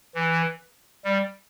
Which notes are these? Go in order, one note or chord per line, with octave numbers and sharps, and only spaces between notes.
E3
G3